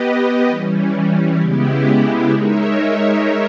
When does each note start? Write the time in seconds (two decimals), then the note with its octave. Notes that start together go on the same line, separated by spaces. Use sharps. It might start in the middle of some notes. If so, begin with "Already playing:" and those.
Already playing: B3 G4 B4 D#5
0.48 E3 G3 C#4
1.39 C#3 G#3 B3 E4 G4
2.32 G#3 D#4 A#4 C#5 E5